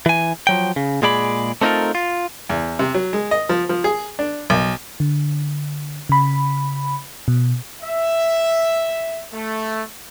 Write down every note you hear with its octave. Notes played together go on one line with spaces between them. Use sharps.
E3 G#5
F3 F#3 G5
C#3
A#2 G#3 G#4 D5 B5
A3 C4 D#4 F4 A4 A#4
F4
E2
C3
F#3
G#3
D#5
F3
F3
G#4
D4
B1
D3
C#3 B5
B2
E5
A3